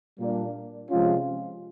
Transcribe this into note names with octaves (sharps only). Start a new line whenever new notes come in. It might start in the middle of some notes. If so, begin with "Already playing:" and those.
A#2 G3 A#3 D4
C3 F3 G#3 C#4 F4